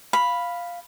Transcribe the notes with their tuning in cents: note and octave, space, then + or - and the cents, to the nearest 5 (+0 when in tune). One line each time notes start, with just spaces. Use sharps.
F5 +0 B5 +0